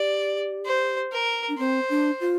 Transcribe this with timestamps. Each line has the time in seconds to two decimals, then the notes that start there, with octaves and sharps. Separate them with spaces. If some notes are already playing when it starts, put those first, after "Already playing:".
Already playing: G4 D5
0.65 C5
1.12 A#4
1.49 D4
1.58 C4 C5
1.89 D4
2.21 F4